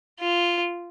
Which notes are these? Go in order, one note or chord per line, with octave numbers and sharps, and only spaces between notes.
F4